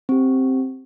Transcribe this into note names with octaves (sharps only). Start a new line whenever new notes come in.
C4 G4